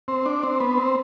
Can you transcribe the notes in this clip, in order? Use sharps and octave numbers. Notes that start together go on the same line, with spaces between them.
C4
D4
C4
B3
C4